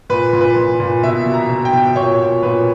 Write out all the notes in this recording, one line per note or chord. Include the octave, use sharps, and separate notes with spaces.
A#2 B4
A#2
B4
A#2
A#2
B2 E5
B2
A#5
B2
G5
B2
A#2 C#5
A#2
A#2 B4